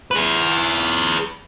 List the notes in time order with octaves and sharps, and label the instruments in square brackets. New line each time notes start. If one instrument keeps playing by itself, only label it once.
[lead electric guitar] G#4 B4